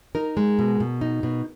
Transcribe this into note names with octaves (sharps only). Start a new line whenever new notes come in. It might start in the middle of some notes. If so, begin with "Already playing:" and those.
D#4 A#4
G#3
B2
B2
D#4
B2